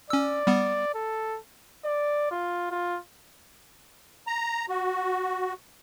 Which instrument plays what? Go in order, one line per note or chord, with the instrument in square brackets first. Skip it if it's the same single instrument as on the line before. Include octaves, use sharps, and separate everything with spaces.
[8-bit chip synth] C#4 E6 [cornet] D5
[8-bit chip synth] G3 B3
[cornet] A4
[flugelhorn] D5
F4
F4
[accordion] A#5
F#4